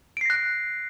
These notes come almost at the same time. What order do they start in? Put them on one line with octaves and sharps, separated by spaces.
D7 C7 A#6 F#6